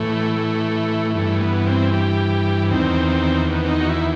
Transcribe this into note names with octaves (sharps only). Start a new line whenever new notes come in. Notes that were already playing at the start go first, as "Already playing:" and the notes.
Already playing: A2 E3 A3
A3
G2 E3 A3
B3
C4
G4
E2 D#3 C4
B3
C4
D#4
F#4
E4